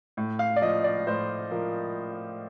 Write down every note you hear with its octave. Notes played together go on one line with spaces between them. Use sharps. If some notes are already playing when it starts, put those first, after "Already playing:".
A2
F5
D5
F3 D#5
D5
A2 C5
F3 A#4